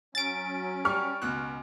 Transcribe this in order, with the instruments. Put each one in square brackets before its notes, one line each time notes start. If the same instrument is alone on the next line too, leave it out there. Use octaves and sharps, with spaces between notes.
[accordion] F#3 C#4 [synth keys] A6 D7
[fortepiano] G3 [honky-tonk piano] C#6 F6
[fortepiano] C#2 B2 F#6